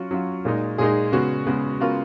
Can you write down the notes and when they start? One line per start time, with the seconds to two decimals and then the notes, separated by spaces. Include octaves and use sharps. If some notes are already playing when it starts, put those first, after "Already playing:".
Already playing: F#3 C#4 F4 F#4
0.11 F#3 C#4 F4
0.45 A#2 G#3 D#4
0.78 A#2 G#3 D#4 G#4
1.12 C#3 G#3 B3 F#4
1.47 C#3 G#3 B3
1.80 C#3 G#3 B3 F4 F#4 A#4